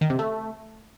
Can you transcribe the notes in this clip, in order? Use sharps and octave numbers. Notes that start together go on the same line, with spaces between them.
D#3
C3
A3